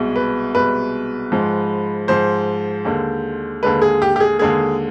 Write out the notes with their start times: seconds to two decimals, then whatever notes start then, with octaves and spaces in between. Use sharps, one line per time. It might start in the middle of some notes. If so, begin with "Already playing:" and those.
Already playing: C2 B2 G#3
0.16 B4
0.54 C2 B2 G#3 B4
1.32 G#2 F3 G#3
2.08 G#2 F3 G#3 C5
2.85 D#2 D3 G#3
3.63 D#2 D3 G#3 B4
3.82 G#4
4.02 G4
4.16 G4
4.20 G#4
4.39 D#2 D3 G#3 G#4